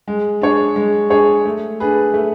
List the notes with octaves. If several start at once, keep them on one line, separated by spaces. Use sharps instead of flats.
G#3
D4 G#4 C#5
G#3
D4 G#4 C#5
A3
D4 G#4 B4
A3